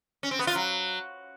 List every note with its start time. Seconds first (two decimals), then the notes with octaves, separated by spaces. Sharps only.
0.23 C#4
0.31 C4
0.39 B3
0.47 F4
0.55 F#3